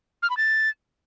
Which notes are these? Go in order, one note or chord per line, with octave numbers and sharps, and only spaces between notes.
F6
B5
A6